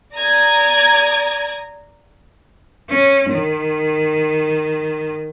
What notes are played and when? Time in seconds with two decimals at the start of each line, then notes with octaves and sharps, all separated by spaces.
0.14 D5 A#5 D#6 G#6
2.90 C#4
3.31 D#3